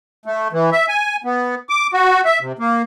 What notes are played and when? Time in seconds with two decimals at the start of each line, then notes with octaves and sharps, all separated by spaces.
0.26 A3
0.53 E3
0.72 E5
0.89 G#5
1.24 B3
1.69 D6
1.93 F#4
2.25 E5
2.41 C3
2.59 A#3